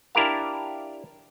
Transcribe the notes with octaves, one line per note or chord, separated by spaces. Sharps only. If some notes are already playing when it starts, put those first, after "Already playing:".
D4 E4 G4 A#4 F5